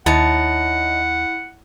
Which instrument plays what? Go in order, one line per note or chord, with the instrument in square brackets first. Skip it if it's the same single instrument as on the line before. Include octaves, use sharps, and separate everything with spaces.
[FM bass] D#2 [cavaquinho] D#4 C#5 A5 [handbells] E4 [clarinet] F#5